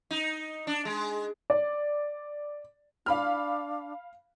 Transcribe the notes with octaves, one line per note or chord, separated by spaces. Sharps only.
D#4
D4
G#3
D5
D4 F5 B5 F6